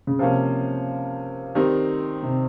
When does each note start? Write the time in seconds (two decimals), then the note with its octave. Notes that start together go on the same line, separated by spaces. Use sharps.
0.07 C#3
0.19 C3 F3 A#3 C#4
1.55 D#3 G3 C4 D#4
2.23 C3